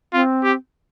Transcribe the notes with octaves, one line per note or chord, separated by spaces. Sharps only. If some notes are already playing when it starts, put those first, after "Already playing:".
C4 F4
G4